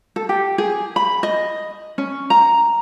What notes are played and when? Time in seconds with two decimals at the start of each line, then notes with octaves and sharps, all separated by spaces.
0.16 A4
0.29 G4
0.58 G#4
0.96 B5
1.23 D#5
1.98 C#4
2.30 A#5